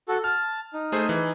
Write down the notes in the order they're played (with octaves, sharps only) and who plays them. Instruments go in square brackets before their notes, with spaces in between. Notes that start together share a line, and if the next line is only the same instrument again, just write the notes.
[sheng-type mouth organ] F#4 A4
[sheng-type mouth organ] A5 [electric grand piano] F6
[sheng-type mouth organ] D#4
[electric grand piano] A3 G#4 C5
E3